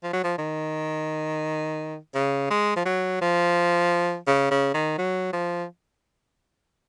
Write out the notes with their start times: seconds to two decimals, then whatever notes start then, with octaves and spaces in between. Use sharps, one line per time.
0.03 F3
0.13 F#3
0.24 F3
0.38 D#3
2.15 C#3
2.51 G#3
2.76 F3
2.85 F#3
3.21 F3
4.27 C#3
4.51 C#3
4.74 D#3
4.98 F#3
5.33 F3